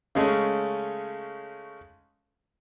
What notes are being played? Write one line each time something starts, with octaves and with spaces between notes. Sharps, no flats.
C#3 G#3 A3 C#4